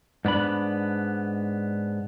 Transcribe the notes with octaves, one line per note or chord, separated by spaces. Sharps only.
G#2 B3 D4 B5